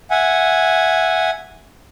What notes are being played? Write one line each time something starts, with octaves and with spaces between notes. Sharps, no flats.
E5 F#5 G#5